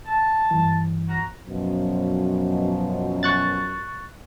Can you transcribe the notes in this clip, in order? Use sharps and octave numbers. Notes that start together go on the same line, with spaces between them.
A5
G2 E3
F#4 A#5
F#2 B2 F3
C#6 F#6 A6